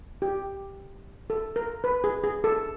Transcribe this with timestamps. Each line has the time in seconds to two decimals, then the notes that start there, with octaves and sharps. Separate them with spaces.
0.22 G4
1.30 A4
1.56 A#4
1.84 B4
2.04 G#4
2.24 G#4
2.44 A4